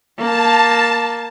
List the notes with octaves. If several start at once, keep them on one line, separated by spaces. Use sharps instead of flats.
A#3 A5